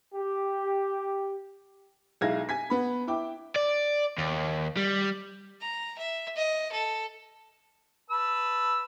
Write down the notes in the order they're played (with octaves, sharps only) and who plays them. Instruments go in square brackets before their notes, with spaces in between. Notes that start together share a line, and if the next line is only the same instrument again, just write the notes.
[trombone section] G4
[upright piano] B1 G#3 E4 F5 G#6 A#6
G#5 G#6 B6
B3 B5
E4 G5 D6
[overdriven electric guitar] D5
D#2
G3
[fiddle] A#5
E5
D#5
A4
[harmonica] B4 A5 E6